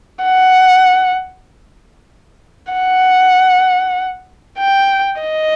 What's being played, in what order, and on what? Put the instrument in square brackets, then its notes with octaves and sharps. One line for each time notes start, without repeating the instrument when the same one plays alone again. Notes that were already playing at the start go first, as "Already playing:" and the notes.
[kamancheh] F#5
F#5
G5
D#5